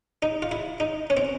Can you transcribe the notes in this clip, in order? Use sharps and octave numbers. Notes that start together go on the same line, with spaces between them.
D#4
F4
E4
D#4
C#4
C4